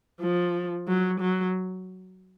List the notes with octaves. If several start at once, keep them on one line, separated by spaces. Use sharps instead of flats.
F3
F#3
F#3